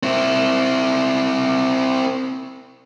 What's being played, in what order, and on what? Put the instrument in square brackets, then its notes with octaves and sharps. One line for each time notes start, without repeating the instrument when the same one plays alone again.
[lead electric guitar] C4 E4